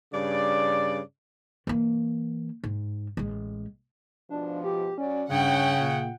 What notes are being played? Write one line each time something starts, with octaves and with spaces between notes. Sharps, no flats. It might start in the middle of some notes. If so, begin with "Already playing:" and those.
G2 C#3 D5
E3 A#3
G#2
A1 G#3
G#2 B2 F3 D4
G4
F#3 C#4 F#4 D5
G2 C#3 C#4 F#5 G5
A#2